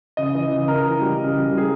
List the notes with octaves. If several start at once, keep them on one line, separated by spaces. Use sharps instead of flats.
C#3 D#5
E3
C#3
C#3 A#4
E3
G3
C#3
C#3
G3
G#4